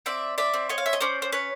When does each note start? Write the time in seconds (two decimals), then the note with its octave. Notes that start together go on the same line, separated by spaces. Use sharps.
0.06 C4 D5 E5
0.38 D5 E5
0.54 C4
0.69 C#5 D#5
0.78 F5
0.86 E5
0.93 D#5
1.01 C#4 C5 D5
1.22 C5
1.32 B4 C#5